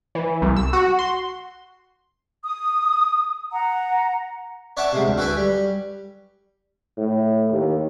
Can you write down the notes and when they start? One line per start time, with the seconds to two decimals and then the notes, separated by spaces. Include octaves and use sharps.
0.15 E3
0.42 C2
0.56 E6
0.73 F#4
0.99 C6
2.44 D#6
3.52 F#5 A#5
4.77 C#5 D5 E5 F#5 A5
4.93 C3 G#3
5.07 D2
5.18 F#4 A4 B4 G5 G#5
5.37 G3
6.98 A2
7.51 D#2